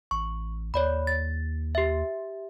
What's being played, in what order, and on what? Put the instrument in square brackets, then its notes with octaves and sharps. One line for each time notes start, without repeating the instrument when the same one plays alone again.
[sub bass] A1 [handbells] C#6
[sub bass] D#2 [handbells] C#5 D5 B5
[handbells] A6
G4 E5